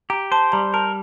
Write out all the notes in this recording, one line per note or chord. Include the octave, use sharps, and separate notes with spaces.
G4 A#5
C5 A5
G3 A#5
A#4 A5